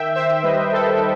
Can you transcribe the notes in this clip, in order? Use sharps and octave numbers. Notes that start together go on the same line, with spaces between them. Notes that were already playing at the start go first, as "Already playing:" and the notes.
Already playing: D#3 E5 G5
D#3 C5 E5
G3 B4 D#5
D#3 A4 C5